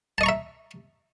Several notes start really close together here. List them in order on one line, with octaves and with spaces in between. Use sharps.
A5 D#5 C#6 A#5 E5